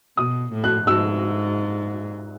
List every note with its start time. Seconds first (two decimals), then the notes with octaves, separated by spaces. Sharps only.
0.17 B2 D#6
0.52 A2
0.64 F#6
0.87 G#2 E6